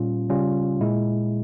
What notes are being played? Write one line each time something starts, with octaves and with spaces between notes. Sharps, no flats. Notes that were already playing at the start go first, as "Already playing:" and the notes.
Already playing: A#2 G3 C#4 F4
C#3 G3 C#4 F4
A#2 G#3 E4